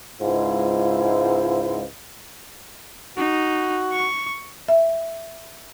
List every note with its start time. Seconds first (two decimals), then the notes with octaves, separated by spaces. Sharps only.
0.21 C#2 G#2 E4 F4 C5
3.17 D#4 F#4
3.93 C#6
4.68 E5